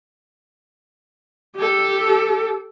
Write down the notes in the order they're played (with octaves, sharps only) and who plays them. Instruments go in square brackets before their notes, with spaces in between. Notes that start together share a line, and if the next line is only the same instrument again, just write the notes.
[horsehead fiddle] G4 A4